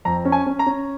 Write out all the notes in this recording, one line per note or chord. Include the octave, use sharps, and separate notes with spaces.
F2 A#5
C#4
G#5
C#4
A#5
C#4